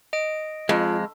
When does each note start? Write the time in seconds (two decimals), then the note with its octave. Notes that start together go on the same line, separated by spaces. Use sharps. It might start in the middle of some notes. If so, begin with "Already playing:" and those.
0.13 D#5 D7
0.69 F2 G#3 F4